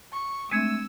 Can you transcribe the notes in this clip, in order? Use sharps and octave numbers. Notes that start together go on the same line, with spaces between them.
C#6
G#3 A3 C4 D4 E6 G#6 C#7 D#7